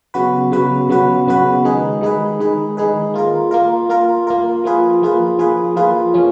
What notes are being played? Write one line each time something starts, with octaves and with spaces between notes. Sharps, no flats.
C#3 F#3 B3 F#4 B4
C#3 F#3 B3 F#4 B4
C#3 F#3 B3 F#4 B4
C#3 F#3 B3 F#4 B4
D#3 G#3 D#4 G#4 B4
D#3 G#3 D#4 G#4 B4
D#3 G#3 D#4 G#4 B4
D#3 G#3 D#4 G#4 B4
A#3 F4 A#4
A#3 F4 A#4
A#3 F4 A#4
A#3 F4 A#4
F3 A#3 F4 G#4 B4
F3 A#3 F4 G#4 B4
F3 A#3 F4 G#4 B4
F3 A#3 F4 G#4 B4
F3 A#3 C#4